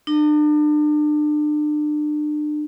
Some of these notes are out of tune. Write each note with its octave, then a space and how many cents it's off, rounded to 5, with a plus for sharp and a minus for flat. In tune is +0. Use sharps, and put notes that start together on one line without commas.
D4 +35